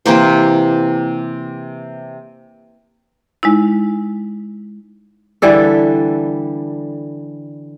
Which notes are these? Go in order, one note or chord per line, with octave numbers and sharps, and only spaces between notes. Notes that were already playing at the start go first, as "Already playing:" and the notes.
C3 E3 A#3 C5
G#3 D#4 E4
D3 E3 G3 A4